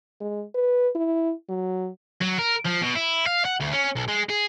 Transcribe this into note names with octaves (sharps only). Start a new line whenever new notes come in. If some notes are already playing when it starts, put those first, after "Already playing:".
G#3
B4
E4
F#3
F#3
A#4
F3
B2
E4
F5
F#5
D2
C#4
B1
G#3
G#4